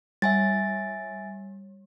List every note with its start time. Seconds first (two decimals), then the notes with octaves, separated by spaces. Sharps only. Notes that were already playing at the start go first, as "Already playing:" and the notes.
0.22 G3 E5 G#5 A6